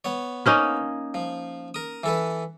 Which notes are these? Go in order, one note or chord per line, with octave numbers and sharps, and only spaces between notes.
B3 C#5
A#3 C#4 D#4
F3
A#4 D#6
E3 A4 B4